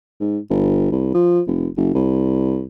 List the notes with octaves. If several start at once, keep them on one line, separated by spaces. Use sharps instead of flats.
G#2
G1
C2
F3
F1
F#1
C2